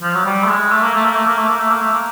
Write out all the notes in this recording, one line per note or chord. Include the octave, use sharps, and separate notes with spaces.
F3
F#3
G3
A3
G#3
A3
A#3
A3
A#3
A3
A#3
A3
A#3
A3
A#3
A3
A#3